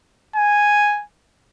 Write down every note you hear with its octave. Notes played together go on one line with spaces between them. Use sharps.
G#5